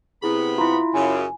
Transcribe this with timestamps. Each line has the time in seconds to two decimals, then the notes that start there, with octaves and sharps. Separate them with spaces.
0.22 C3 B3 E4 G#4 B5
0.58 E4 F4 A#5
0.94 F#2 C#3 G#5